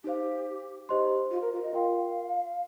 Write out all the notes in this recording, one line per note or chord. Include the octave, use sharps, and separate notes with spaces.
D#4 G4 C5 F5
D#4 G4 C5 D#5 C6
F4
A#4
F4
D#5
F4 A#4 F5 G5 C6